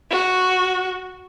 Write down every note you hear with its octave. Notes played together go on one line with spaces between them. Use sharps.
F#4